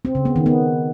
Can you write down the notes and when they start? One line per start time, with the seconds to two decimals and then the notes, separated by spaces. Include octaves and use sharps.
0.05 C4
0.15 C#3
0.25 B3
0.36 D#3
0.46 B3